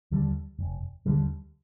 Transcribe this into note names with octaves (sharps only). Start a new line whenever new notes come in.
D#2 D3 G3
F1
D#2 D3 G3